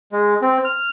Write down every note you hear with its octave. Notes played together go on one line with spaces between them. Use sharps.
G#3
C4
F6